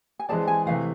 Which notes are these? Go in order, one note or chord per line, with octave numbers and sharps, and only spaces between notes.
G#5
E3 G#3 C4 G#4 D5 A5
G#5
C3 E3 A3 F5